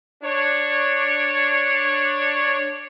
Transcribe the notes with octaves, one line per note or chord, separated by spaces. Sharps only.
D4 C#5